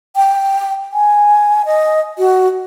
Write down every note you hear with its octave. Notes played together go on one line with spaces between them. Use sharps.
G5
G#5
D#5
F#4